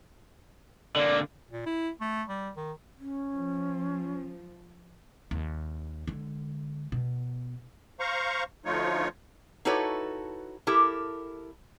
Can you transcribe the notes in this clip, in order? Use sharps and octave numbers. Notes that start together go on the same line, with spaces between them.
D3 A#3 D5
A#2
E4
A3
G3
D#3
C#4
F3
D#2
D3 G#3
B2
C5 F5 A#5 C#6
D2 F3 A3 D#4 F4 C#5
D#4 E4 F#4 A4 B4 C#5
E4 G4 A4 A#4